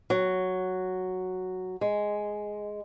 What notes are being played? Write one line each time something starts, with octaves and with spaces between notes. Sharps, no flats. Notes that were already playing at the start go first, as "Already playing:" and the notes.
F#3
G#3